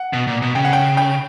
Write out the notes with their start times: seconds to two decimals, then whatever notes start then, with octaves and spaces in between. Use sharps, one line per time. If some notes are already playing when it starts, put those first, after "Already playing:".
Already playing: F#5
0.13 B2
0.27 A#2
0.42 B2
0.55 C#3 G5
0.65 F#5
0.73 G5
0.97 G5